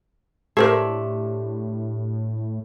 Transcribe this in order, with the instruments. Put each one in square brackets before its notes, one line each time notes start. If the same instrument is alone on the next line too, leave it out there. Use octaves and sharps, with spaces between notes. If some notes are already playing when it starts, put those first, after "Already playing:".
[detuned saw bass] A2 [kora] A3 D4 [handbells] G4 [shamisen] A#4 C5 E5